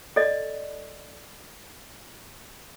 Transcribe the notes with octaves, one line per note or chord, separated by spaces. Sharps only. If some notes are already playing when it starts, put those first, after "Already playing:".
A4 D5 D#5